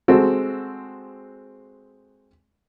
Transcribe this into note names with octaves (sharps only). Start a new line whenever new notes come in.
G#3 C4 F#4 A4